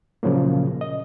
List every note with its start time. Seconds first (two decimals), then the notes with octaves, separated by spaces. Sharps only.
0.23 A#2 C#3 F3 F#3 A#3
0.81 D#5